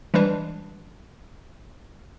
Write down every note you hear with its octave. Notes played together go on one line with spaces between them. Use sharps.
E3 G3 G#3 D4 B4